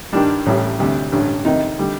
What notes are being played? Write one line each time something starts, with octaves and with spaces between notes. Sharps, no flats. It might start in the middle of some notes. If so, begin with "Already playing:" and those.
G2 D#3 G3 D4
A1 A2 G3
D2 C3 G3
A1 G2 D3
F2 C3 D#3 D#4
D3 G3